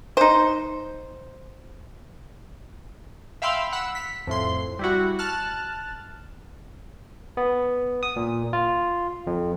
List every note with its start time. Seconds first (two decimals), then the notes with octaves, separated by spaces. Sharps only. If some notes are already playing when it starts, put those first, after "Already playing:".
0.17 D#4 C5
3.42 E5 F5 G5 B5 C6 E6
3.73 F#5 B5 E6
3.95 B6
4.27 F2 A2 C6
4.79 G3 E4 F#4
5.19 A5 F6 F#6
7.37 B3
8.03 D#6
8.16 A#2
8.53 F4
9.27 F2